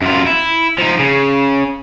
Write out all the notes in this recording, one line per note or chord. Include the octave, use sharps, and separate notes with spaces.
F#2 F4
E4
F3 D#4
C#3